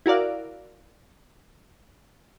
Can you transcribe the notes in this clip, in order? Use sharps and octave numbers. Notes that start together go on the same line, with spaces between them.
E4 F#4 A#4 D5 F5